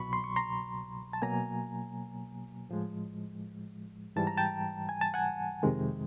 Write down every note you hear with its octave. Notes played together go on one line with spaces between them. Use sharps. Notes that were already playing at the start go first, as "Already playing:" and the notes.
Already playing: C2 B2 F#3 B5 C#6
C6
C#6
A#5 C6
A5
B2 F#3 A#3 G#5 A#5
A2 F3 G#3
G#2 E3 G3 A5
A#5
G5 A5
G#5
A5
F#5 G#5
F2 C3 D#3 G#3